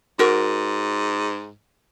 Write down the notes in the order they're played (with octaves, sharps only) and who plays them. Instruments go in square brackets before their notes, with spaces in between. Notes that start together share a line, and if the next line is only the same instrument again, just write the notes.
[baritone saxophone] G#2 [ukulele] F#4 A#4